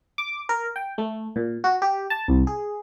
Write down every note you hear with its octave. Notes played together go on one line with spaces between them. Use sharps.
D6
A#4
G5
A3
A#2
F#4
G4
A5
C2
G#4